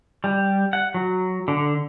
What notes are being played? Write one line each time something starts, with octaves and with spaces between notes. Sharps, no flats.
G3
F#5
F#3
D3